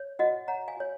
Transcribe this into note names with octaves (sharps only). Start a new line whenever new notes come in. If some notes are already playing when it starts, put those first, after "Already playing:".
Already playing: C#5
F#4 D#5 F#5
C#5 F#5 A#5
F5 G#5
F#4 C#5